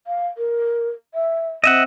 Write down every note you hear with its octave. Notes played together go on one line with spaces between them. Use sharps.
F5
A#4
E5
C4 D#5 E5 F#5